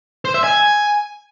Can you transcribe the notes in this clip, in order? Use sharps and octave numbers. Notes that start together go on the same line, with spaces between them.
C5
E5
G#5